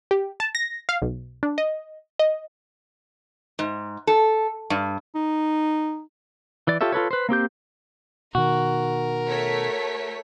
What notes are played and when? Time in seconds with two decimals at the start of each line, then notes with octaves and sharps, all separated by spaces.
0.11 G4
0.40 A5
0.55 A#6
0.89 F5
1.02 B1
1.43 D4
1.58 D#5
2.19 D#5
3.59 G#2
4.07 A4
4.70 G2
5.15 D#4
6.67 E3 D5
6.81 F4 G4 A4 C#5 E5
6.92 F4 A4 B4 C#5
7.11 B4 C5
7.29 A#3 C4 G4 G6
8.35 B2 D#3 F#4 A#4
9.27 A3 C#5 B6